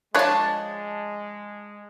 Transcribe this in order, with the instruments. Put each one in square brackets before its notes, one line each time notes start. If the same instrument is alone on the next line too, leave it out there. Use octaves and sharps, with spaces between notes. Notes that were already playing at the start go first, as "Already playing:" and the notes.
[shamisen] F3 C#5 [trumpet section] G#3 [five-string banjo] D4 F5 [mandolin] A5 F#6